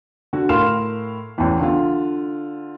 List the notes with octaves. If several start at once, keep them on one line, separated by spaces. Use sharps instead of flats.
D3 F#4
A2 A#4 F5 C6 F6 E7
A1 E2
D3 F4